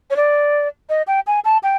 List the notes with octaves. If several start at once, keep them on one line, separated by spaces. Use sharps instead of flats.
C#5
D5
D#5
G5
G#5
A5
G5